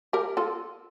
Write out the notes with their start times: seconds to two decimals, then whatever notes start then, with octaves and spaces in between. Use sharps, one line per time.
0.13 G4 A#4
0.37 F4 A4